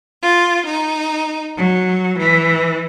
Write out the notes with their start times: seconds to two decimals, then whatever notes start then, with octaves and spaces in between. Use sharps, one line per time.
0.21 F4
0.65 D#4
1.57 F#3
2.19 E3